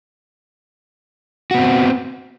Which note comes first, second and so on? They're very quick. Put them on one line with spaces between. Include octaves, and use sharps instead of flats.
F#4 B3 C4